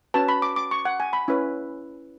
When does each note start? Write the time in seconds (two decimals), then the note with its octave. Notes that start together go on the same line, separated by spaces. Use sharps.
0.14 C#4 F#4 B4 A5
0.28 B5
0.42 D6
0.56 D6
0.71 C#6
0.85 F#5
1.00 G#5
1.13 B5
1.28 C#4 E4 B4